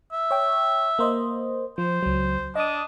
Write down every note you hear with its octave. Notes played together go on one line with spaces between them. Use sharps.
E5
C#5 G5
A#3 C5 D#5
F3 C5
C#2 F#3
D4 D#5 D#6